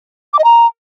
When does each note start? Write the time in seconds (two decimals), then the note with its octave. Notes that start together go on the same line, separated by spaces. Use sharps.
0.33 D6
0.39 D#5
0.44 A#5